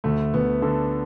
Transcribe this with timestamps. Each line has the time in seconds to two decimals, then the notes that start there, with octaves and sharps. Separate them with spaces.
0.04 D2 A3
0.34 D2 B3
0.62 D3 A4